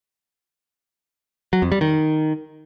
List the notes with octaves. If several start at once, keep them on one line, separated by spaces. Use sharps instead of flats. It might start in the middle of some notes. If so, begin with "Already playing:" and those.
F#3
F2
G3
D#3